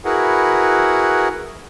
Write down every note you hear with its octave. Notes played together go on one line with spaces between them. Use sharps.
E4 F#4 G#4 A#4 B4 F#5